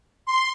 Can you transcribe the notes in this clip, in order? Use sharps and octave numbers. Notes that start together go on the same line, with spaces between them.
C6